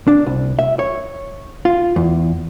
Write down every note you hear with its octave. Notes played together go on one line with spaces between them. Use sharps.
D4
C2
E5
C#5
F4
E2